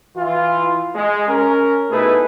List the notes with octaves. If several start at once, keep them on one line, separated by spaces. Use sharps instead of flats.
E3 F4
G#3
C#4 A#4
B2 A3 D#4 E4 G#4 B4